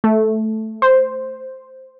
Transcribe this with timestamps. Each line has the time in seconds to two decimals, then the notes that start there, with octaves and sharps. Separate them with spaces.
0.04 A3
0.82 C5